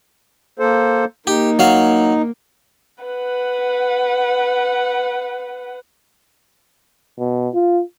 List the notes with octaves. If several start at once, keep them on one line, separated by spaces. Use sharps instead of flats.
A#3 A4 C5
A#3 D#4 G4
F#3 F5
B4 F#5
B2
F4